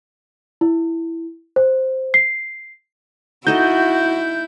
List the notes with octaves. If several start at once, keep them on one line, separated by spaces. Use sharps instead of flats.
E4
C5
C7
D#4 E4 F#4 A4 D#5 G6